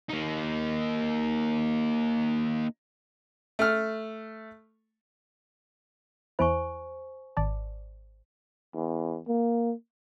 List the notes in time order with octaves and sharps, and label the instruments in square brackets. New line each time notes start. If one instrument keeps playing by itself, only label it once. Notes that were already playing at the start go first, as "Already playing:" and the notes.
[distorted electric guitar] A#3 D#4
[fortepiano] A3 F6
[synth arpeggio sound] E2 E4 [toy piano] C5 G#5 C#6
[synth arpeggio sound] G#1 D5 A5
[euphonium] E2
A#3